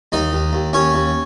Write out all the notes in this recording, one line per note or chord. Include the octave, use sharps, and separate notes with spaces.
D#2 D#4 D#5
D#2
D#2
D#2 C#4 C#5
D#2